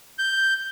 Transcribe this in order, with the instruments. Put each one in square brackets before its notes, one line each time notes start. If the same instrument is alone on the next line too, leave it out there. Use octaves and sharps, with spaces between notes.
[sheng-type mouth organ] G6